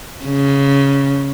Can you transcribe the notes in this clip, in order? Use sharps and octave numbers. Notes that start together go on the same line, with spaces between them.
C#3